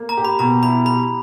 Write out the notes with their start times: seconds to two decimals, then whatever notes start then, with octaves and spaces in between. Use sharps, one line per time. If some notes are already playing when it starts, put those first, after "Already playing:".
Already playing: A#3
0.09 A#5
0.17 G4
0.25 B5
0.39 B2 A#5
0.62 E4 B5
0.85 G4 B5